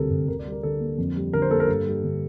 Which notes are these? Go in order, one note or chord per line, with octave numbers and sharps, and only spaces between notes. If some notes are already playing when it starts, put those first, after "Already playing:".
Already playing: D2 C3 G3 C4 A4 A#4
D2
D2 A#4
D5
G3
A#4
D3 A4
A#3
F2
G3
D3 A#4
C5
A#3 A4
A#4
G2 A4
G3
D3